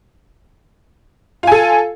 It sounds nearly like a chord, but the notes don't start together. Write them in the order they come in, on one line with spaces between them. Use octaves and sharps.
F4 G#5 A4